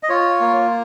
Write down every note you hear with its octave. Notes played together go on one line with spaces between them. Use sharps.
D#5
F4 C#5
A#3